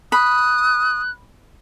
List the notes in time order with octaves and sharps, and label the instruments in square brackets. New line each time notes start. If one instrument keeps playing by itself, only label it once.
[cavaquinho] B5 [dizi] D#6 [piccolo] F#6